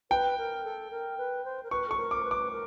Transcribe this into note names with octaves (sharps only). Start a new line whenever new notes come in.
B4 G5
A#4
A4
A#4
B4
C5
A#4
B4 C#6
A4 C#6
A#4
D6
B4
D6
A#4